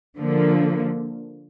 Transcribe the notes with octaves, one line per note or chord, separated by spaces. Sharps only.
D3 F3 A#3